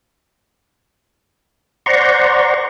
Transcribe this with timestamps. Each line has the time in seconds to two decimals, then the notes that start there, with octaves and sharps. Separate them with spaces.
1.86 C5 D5 F#5 A#5 C6 C#6